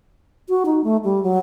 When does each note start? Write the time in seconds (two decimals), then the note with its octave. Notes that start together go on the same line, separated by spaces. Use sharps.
0.49 F#4
0.66 D#4
0.84 A3
1.04 G3
1.23 F#3